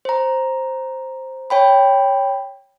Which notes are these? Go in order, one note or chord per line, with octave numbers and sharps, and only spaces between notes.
C5 A#5
C#5 G5 B5